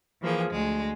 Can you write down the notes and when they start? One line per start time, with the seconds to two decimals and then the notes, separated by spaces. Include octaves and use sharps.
0.22 E3 F3 A#3 G#4
0.51 D2 G#3